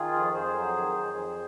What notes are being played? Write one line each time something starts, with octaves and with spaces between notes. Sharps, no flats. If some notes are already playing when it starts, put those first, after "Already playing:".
Already playing: D#3 F4 G#4
F2
F2 G#4 C5
F#3
D#3
F2
F3